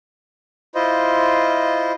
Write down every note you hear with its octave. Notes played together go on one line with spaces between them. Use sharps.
E4 F4 C5 D#5